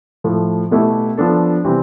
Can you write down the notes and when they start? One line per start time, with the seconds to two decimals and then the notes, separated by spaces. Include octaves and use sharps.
0.24 A2 F3 A3
0.71 B2 A3 E4 G4
1.18 F3 B3 D4 A4
1.64 C3 E3 G3 C4 G4